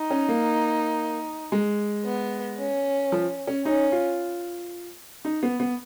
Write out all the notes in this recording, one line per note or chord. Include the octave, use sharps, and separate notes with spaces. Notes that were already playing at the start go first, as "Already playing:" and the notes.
Already playing: D#4
C#4
A#3
G#3
B3
C#4
F3
C#4
C#4 D#4
F4
D#4
B3
B3